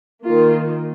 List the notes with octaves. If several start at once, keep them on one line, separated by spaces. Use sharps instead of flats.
D#3 A#3 F4